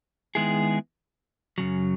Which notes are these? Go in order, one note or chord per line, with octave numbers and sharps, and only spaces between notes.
D#3 G#3 B3 E4 G#4
F#2 C#3 F#3